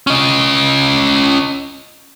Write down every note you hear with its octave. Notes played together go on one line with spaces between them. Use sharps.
C#4 D#5